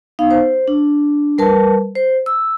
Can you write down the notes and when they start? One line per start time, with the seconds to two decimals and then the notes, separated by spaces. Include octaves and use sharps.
0.19 B3 D#4 F5
0.31 C5
0.68 D4
1.38 G3 A#4 B4 A5
1.95 C5
2.26 E6